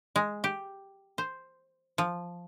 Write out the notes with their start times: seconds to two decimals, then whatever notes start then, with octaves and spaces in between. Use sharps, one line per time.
0.16 G#3
0.44 G4
1.18 C5
1.98 F3